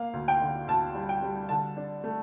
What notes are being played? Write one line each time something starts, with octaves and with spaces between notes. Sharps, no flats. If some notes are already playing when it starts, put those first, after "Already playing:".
Already playing: A#3 F5
D2
G5
D3
D2 A5
G3
G5
G3
D3 A5
D4
A3